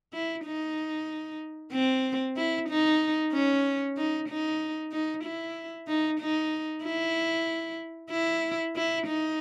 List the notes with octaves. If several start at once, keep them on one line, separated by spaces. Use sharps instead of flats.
E4
D#4
C4
E4
D#4
C#4
D#4
D#4
D#4
E4
D#4
D#4
E4
E4
E4
D#4